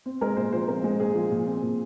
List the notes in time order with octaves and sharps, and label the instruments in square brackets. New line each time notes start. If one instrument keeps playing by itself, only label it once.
[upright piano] C4
G#3 A#4
A#2 C5
F3 C5
C4 A#4
G#3
A#2 G#4
F3
A#2
C4
A#2